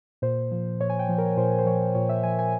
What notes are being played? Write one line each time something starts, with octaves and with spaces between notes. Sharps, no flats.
A#2 C5
F3
A#2 C#5
G#5
G5
F3
A#4
A#2 C5
C5
F3 C#5
A#2 C#5
E5
F3 G#5
G#5